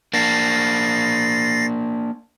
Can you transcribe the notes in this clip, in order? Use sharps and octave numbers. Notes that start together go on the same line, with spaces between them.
A#3 D4 A6 A#6 C7